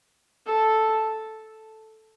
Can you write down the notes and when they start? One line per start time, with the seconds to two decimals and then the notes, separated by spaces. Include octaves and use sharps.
0.46 A4